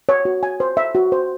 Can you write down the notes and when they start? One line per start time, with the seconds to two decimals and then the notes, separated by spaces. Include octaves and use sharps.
0.09 C#5
0.25 F#4
0.43 G#5
0.60 C5
0.77 E5
0.95 F#4
1.12 C5